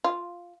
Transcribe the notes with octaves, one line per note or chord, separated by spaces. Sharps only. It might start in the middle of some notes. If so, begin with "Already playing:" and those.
F4